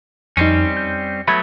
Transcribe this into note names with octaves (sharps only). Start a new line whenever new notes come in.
F2 G3 C4 C#4 D#4
G6
F#3 A3 B3 B5 G#6 A#6